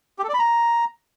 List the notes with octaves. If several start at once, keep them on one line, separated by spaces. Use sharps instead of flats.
G4
A4
D5
B5
A#5